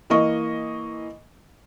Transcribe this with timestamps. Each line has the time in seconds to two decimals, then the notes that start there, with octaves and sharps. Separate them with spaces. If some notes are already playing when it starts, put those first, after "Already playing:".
0.10 E3 A#3 D#5 C#6